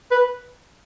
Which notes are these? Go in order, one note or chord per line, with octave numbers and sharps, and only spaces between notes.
B4